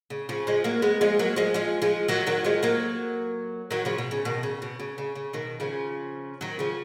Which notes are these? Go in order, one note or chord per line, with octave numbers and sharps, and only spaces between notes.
C#3
C#3 F3
F3 G#3
F#3 A#3
G#3 B3
F3 G#3
F#3 A#3
F3 G#3
F3 G#3
F3 G#3
D#3 F#3
D#3 F#3
F3 G#3
F#3 A#3
D#3 F#3
C#3 F3
B2
C#3
B2 D#3
C#3
B2
C#3
C#3
C#3
B2 D#3
C#3 F3
D#3 F#3
C#3 F3